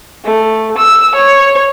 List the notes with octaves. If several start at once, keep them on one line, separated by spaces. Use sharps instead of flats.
A3
E6
C#5